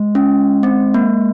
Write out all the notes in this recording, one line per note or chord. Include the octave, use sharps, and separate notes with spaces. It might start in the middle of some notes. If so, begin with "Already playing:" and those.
Already playing: G#3
C#4
C4
A#3